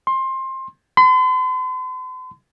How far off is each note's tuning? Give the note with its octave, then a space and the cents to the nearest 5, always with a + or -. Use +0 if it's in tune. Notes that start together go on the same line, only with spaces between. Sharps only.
C6 +20
C6 -45